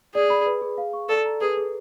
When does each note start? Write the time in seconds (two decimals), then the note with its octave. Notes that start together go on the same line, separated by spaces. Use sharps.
0.14 G#4 D5
0.30 B5
0.46 B4
0.62 G#4
0.78 F5
0.93 C#6
1.09 A4 D5
1.25 A#5
1.41 G#4 B4
1.57 G#4